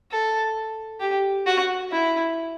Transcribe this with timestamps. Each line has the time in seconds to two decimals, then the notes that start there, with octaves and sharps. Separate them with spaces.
0.11 A4
1.00 G4
1.46 F#4
1.92 E4